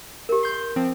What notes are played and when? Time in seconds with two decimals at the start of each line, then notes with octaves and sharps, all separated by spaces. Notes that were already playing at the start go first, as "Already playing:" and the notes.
0.29 G4 A#4
0.43 C6 G6
0.76 F3 C4